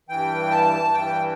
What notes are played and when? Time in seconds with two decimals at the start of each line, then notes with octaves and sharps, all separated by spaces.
0.09 G2 E3 G5
0.51 A5
0.94 G2 E3 G5